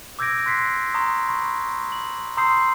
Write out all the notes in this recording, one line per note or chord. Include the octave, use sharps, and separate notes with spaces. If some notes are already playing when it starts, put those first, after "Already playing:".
D6 E6 G6 G#6 A#6 D7
C6 F#6 B6 C7
A#5 C6 C#6 D#6
B5 C#6
F#7
A#5 C6 D#6 E6 G6 C7